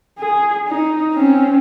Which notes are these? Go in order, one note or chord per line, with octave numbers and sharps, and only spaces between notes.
G#4
D#4
C4 C#4